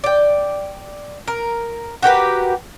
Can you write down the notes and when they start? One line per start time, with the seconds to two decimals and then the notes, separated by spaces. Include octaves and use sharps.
0.04 D5 G5
1.28 A#4
2.02 F#4 G4 A#4 B4